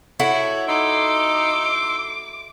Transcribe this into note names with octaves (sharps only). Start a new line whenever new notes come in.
E4 F#4 A4 C#5
D#4 C6 D6 E6